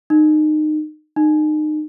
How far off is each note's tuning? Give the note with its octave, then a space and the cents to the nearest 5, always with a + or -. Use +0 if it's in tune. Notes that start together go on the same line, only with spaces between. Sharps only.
D#4 -25
D#4 -30